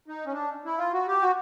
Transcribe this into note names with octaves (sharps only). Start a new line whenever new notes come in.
D#4
C#4
D4
E4
F4
F#4
G4
F#4